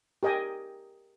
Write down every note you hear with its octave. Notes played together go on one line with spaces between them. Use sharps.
G4 A#4 D#5 G5 G#5